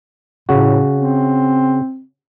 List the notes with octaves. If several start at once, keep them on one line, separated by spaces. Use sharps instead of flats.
A2 C#3 F#4
C4